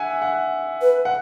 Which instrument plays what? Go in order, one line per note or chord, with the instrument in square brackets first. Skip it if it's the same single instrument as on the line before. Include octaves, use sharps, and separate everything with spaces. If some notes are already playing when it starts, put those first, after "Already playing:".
Already playing: [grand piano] E5 F#5 G#5
F#5
[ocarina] B4
[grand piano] F#5